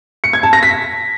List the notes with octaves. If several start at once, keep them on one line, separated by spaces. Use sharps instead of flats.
C#7
G#6
A5
A#6
B6